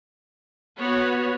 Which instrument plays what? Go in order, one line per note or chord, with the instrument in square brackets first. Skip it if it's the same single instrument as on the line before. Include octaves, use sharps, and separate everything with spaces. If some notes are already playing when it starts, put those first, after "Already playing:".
[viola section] B3 F#4 C#5